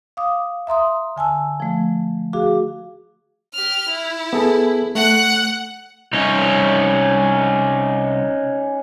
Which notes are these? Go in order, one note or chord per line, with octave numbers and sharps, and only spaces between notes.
F5 D6 D#6
E5 A#5 C6 D#6
D3 G#5 A5 E6
F3 A3
F#4 G#4 F5 D6
G4 F6
E4
B3 G#4 A4
A3 F#5 F#6
C2 C#4 D#4 C#5